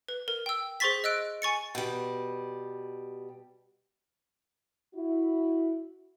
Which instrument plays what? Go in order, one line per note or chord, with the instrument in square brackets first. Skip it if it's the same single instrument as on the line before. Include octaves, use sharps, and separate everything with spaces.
[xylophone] B4
A#4
G5 E6
G#4 C5 C6 C#6 A6 B6
D#5 E6 F#6 D7
G#5 C#6 A6 C#7
[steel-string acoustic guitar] B2 G3
[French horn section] E4 F#4